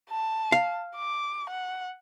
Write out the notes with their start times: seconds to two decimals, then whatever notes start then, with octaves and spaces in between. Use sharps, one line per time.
0.11 A5
0.52 F5
0.96 D6
1.50 F#5